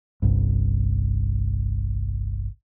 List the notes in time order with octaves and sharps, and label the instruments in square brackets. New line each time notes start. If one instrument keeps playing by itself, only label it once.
[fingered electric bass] G1 C2 G2